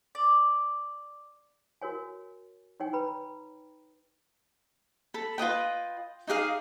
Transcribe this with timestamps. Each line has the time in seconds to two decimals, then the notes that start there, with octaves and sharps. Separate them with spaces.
0.15 D5
1.82 F#4 A#4 C#5 G#5
2.80 D#4 C#5 G5 G#5
2.93 B4 G5 A#5 B5
5.14 A4 B5
5.38 F4 B4 D#5 G5
6.27 D#4 G4 G#4 F5